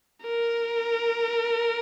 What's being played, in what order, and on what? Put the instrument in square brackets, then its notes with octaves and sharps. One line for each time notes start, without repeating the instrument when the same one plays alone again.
[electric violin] A#4